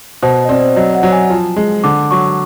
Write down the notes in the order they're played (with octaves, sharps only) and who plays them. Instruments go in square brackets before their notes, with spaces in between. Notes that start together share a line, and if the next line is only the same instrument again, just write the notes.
[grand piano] B2 [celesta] C5
[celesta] D#5
[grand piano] C4 [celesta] D5
[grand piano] F#3 [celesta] D#5
[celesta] F#5
[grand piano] F#3
[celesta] G#5
[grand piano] F3
G#3
[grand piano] D3 [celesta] D6
[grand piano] F#3 [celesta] C#6